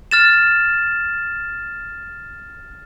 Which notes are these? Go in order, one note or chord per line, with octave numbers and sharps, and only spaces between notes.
F6 A6 E7